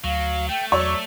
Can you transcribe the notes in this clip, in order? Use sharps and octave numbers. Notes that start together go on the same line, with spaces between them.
D2 F#3 F5
A3 G5
E2 F#3 C#5 D5 E6